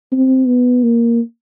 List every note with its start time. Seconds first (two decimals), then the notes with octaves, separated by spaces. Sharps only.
0.12 C4
0.47 B3
0.83 A#3